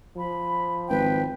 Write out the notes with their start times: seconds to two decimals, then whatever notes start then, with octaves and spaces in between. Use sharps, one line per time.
0.17 F3 B5
0.89 G#1 B4 G5